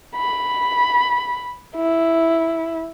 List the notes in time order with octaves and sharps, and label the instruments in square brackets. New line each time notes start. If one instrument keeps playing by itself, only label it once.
[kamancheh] B5
E4